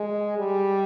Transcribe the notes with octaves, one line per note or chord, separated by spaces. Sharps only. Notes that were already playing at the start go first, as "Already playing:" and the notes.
Already playing: G#3
G3